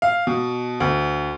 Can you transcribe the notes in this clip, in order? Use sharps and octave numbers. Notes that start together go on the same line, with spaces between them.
F5
B2
D2